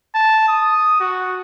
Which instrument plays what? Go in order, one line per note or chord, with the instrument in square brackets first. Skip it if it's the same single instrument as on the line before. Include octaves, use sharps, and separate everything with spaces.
[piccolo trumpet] A5
D#6
F#4